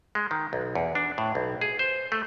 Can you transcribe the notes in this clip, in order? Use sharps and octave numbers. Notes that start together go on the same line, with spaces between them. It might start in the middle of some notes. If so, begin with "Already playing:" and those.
G#3
D#3
B1
E2
D4
A2
B1
G#4
C5
A3